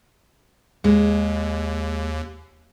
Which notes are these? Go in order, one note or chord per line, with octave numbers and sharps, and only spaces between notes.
D#2 G#3